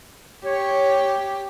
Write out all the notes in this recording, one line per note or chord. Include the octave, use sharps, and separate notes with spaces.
G4 C#5